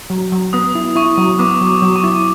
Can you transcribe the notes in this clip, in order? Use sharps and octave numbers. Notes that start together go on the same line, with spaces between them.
F#3
F#3
B3 D#6
E4
E4 C#6
F#3
B3 D6
F#3
D6
F#3
C#6
E4